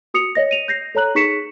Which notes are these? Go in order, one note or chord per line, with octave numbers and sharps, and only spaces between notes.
F#4 D#6 C#7 F7
C#5 D#5 A#6
D#7 F7
G6 A#6 C7
A4 C#5 A#5 F#6 F#7
D#4 G#4 C#6 B6 C#7 E7